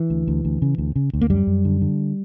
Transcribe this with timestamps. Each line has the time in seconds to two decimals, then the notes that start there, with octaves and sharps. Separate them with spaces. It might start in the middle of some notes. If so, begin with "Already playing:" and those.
Already playing: E3
0.10 D2
0.27 D2
0.45 D2
0.62 C#3
0.78 D2
0.96 C#3
1.13 D2
1.21 A#3
1.30 F#2 G3
1.47 F#2
1.65 D3
1.81 D3